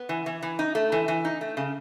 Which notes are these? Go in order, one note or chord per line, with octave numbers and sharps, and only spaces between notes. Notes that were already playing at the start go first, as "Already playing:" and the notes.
Already playing: B3
E3
E3
E3
D#4
A3
E3
E3
D#4
A3
C#3